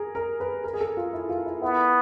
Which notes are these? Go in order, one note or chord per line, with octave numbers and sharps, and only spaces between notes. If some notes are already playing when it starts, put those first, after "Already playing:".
Already playing: G#4 A#4
A#4
B4
A#4
G#4
A4
F4
E4
F4
E4
B3 E4